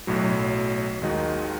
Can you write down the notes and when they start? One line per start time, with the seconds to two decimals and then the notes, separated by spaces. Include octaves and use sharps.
0.07 B1 A2 F#3
1.02 D#2 D#3 G#3 D#4 F#4